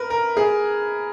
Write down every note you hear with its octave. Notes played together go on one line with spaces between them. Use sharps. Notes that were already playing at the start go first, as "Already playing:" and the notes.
Already playing: A#4 B4
A#4
G#4